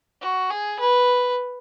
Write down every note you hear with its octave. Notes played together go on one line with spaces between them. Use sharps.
F#4
G#4
B4